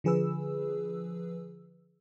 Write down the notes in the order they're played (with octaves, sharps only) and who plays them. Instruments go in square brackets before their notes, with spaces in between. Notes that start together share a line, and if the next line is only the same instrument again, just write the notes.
[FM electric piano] D3 F3 G#4 B4 E6